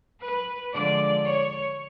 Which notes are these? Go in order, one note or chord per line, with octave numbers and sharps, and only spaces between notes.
B4
D3 F3 G#3 D5
C#5